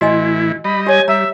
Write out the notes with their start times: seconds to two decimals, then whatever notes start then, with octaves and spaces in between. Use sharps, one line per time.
0.01 A2 E3 E4 F#4 D#5 G#5
0.64 G3 D#5 B5
0.87 G4 C#5 G#5
1.08 G3 E5 A#5